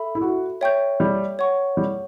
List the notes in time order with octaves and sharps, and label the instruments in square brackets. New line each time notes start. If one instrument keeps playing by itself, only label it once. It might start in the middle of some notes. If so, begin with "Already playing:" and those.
Already playing: [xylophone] A4 E5 B5
[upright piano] E4
F#4
[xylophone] C#5 E5 G5 C#6 G6
[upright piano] G3
[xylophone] C#5 F#5 C#6
[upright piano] G3